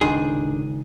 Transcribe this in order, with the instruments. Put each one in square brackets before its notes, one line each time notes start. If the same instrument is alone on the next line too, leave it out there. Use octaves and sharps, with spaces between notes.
[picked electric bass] D1 D4 [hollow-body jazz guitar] C#2 D#3 G#4